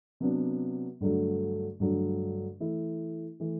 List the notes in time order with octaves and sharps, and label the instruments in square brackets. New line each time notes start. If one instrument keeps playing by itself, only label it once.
[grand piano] C3 F#3 B3 D4
G2 D3 F#3 A3
G2 D3 F#3 A3
E3 A3 E4
E3 A3 E4